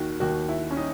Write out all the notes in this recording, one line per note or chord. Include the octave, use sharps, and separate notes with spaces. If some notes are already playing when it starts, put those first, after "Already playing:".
Already playing: D#2 D#3 F#4
D#2 D#3 F#4
E4
C#4
D#4